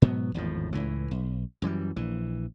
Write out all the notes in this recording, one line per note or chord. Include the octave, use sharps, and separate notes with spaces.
G#2 B2 F#3 B3
G#1 E2 A2 F3
C#2 A2 E3
B1
F#2 E3 F#3 G3
A#1 E3